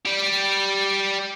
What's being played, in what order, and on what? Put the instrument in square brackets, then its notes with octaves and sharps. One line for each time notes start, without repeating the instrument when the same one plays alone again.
[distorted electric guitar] G3 G4